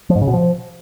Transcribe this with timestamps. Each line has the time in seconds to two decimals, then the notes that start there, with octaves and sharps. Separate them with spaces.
0.10 F3
0.16 G#2
0.22 C#3
0.27 B2
0.33 F3